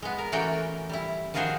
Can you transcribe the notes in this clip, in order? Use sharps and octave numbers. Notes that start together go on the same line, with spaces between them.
G#3 B3
A#4
E3 A3 C#4 F#4 A#4 G5
G3 E4
D#3 F3 F4 F#4 G#4 C5